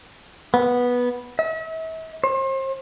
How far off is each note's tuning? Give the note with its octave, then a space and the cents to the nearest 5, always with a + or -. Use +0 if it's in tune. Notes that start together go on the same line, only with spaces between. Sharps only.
B3 -10
E5 -40
C5 +35